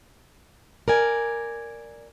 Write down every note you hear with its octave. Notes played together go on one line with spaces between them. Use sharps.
A#4 D5 G#5